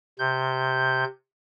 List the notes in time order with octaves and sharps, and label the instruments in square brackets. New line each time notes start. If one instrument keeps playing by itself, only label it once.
[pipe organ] C3 G6